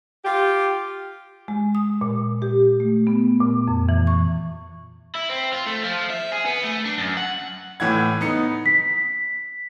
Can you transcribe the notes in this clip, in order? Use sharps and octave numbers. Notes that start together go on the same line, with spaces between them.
F4 G4
G#3
D#6
A#2
G4
A3
B3
A#2
F2
E3
C#6
E4
C4
F4
A3
F3
E5
G#4
B3
A3
D4
F#2
F#5
A2 E3 F#5 G#6
B3 D#4 C#7
B6